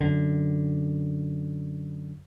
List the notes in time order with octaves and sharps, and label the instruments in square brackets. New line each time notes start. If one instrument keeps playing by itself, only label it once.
[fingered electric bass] F#2 D3